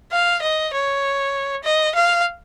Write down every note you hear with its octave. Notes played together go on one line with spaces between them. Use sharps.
F5
D#5
C#5
D#5
F5